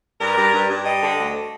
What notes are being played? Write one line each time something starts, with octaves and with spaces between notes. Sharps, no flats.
G2 A#4
G2
G2
G2
G3 D#5
D3
D2